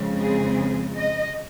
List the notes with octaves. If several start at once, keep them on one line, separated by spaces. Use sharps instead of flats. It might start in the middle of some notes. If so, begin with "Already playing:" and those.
Already playing: F2 C#3 G#3 C4
G#4
D#5